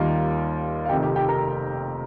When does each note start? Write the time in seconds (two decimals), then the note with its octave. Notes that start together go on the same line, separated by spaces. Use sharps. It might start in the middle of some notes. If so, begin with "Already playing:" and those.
Already playing: D#2 D#3 G3 A#3 F4 F5
0.85 F5
0.89 F1 F2 D#3 G4 G5
1.02 G4 G5
1.16 G4 G5
1.28 A#4 A#5